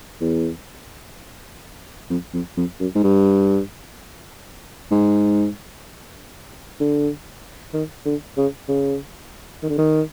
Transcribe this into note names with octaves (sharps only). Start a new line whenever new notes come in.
E2
F2
F2
F2
F#2
G#2
G2
G#2
D3
D#3
D3
C#3
C#3
D#3
D3
D#3